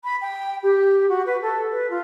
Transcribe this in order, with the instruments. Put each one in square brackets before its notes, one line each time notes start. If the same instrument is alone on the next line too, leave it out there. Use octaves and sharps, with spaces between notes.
[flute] B5
G5
G4
F#4
B4
A4
B4
F4